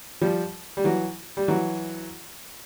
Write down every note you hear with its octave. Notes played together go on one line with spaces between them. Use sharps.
F3 G3
G3
E3 F#3
G3
E3 F#3